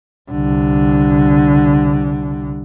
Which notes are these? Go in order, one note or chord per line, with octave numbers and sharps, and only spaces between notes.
C2 D3